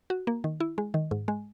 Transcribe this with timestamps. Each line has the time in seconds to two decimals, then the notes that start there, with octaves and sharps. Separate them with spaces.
0.10 F#4
0.27 A#3
0.44 D#3
0.60 E4
0.78 G#3
0.94 D#3
1.11 G#2
1.28 G#3